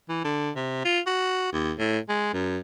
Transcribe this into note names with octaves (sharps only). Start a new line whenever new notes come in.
E3
D3
C3
F4
F#4
D#2
A2
G#3
F#2